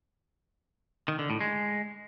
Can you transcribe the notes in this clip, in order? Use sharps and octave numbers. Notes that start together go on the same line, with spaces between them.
D#3
D3
A2
G#3